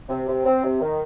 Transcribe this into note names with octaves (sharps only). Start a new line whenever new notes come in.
C3
C3
C4
C3
D#3